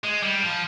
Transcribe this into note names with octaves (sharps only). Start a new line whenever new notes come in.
G#3
G3
F3